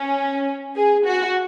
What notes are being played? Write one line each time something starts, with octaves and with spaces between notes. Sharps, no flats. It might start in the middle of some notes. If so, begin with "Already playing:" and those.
Already playing: C#4
G#4
F#4